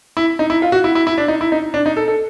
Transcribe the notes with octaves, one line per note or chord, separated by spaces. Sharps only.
E4
D#4
E4
F4
F#4
E4
E4
E4
D4
D#4
E4
D#4
D4
D#4
A4
A4